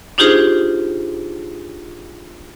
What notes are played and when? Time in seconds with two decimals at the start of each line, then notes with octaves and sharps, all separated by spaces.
0.18 D4 D#4 F4 G4 G#4 C5